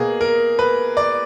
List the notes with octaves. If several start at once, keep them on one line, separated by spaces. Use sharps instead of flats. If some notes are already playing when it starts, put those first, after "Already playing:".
Already playing: B2 A#3 G#4
A#4
B4
D5